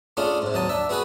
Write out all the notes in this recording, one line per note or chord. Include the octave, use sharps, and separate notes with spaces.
A3 C#4 D4 F4 G#4
G#2 C3
D#2 F#3 A5 D#6
D4 E5
B3 F#4 G#4 B4 G#5